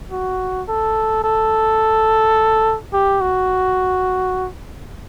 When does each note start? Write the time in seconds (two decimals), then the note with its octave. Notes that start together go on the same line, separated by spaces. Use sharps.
0.12 F#4
0.68 A4
1.24 A4
2.93 G4
3.21 F#4